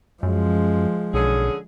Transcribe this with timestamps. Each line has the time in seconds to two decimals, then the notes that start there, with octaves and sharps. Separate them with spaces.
0.23 F#2 F3 G#3
1.13 B1 D3 C#4 G#4